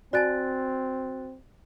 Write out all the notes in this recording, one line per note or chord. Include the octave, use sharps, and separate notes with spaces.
C4 F#4 D5 G#5 A5 F#6 A6